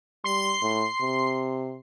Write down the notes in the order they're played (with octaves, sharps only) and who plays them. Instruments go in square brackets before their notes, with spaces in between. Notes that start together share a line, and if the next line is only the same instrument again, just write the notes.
[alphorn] G3 [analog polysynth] C6 C7
[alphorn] A2
C3